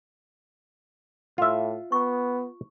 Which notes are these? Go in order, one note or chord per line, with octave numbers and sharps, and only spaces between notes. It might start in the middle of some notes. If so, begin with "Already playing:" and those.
A2 F4 E5
B3 C#6